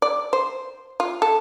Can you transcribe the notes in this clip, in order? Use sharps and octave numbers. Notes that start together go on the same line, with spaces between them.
D5
C5
F4
A4